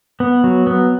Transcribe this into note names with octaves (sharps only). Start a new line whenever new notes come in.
B3
F#3
B3